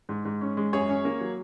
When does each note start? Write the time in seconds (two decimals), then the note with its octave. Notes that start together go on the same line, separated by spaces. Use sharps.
0.09 G#2
0.25 G#2
0.41 C#4
0.57 G#3
0.73 F#2 G#4 C#5
0.89 C#4
1.05 A#3
1.21 F#3